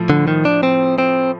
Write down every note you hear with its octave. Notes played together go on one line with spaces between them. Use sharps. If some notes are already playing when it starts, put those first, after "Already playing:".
Already playing: A2 F3 A3
D3
D#3
D4
C4
C4